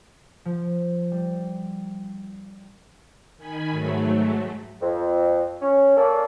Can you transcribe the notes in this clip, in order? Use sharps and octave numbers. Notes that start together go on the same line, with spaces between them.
F3
G3
D#3 G#5 B5
G#2 F#3 A3
F2
C#4
A#3 C#4 A4 D5